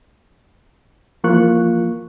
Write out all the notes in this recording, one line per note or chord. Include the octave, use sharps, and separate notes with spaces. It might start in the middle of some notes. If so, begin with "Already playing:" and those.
E3 F3 A#3 F4 C#6 F#6